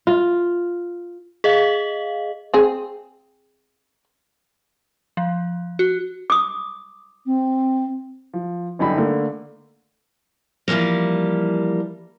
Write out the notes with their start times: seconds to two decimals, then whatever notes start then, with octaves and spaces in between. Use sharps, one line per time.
0.07 F4
1.44 G#4 D#5 F5
2.54 C4 G#4
5.17 F3
5.79 F#4
6.30 D6 D#6
7.26 C4
8.34 F3
8.79 G1 F#2 D3 D#4 G5 B5
8.98 D3 A3 A#3
10.68 E3 F3 G3 G#3 A#3